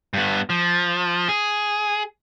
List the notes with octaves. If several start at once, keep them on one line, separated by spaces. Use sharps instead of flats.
G2 B3
F3
G#4